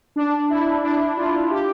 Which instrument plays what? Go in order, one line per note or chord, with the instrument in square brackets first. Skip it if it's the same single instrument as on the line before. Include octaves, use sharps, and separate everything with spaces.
[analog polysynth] D4
E4
D4
F4
G4